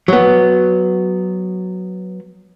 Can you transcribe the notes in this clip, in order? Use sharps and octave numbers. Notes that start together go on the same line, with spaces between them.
F#3 B3